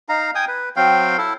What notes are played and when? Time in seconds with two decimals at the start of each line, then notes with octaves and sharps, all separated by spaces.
0.09 D#4 F5 A#5
0.35 G5 G#5 D#6
0.48 B4
0.76 F#3 C4 F5 G5
1.18 E4 A4